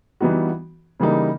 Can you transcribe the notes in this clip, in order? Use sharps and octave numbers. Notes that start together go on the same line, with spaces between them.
E3 G3 B3 D#4 F#4
C#3 E3 G3 A#3 D#4